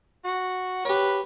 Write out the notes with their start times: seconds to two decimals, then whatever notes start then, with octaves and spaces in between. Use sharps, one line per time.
0.24 F#4
0.85 G4 B4 C#5